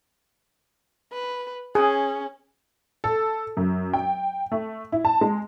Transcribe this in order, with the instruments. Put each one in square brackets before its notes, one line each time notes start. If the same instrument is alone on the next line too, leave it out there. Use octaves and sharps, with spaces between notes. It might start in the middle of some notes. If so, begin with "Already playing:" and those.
[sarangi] B4
[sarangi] C#4 [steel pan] G#4
[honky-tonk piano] A4
F#2
G5
A3
E4
A5
G#3